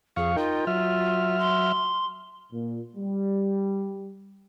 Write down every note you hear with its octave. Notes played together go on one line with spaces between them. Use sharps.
F2 G#4 F5 C#6
D#4 F4 A#4 G5
F#3 E5 F6
C6
A#2
G3